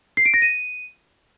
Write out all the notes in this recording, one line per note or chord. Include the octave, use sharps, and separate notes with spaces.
C7
D7
A#6
D#7